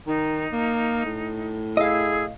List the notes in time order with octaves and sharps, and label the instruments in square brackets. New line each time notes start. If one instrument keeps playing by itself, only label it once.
[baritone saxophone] D#3 [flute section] D#4
[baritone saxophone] A#3
A2
[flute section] E4 G#4 E6 [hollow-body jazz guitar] D#5 F5